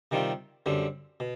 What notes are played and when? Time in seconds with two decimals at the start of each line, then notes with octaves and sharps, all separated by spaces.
0.11 C3 D#3 G3 C4 F4
0.66 F#2 D3 G3 C4
1.20 B2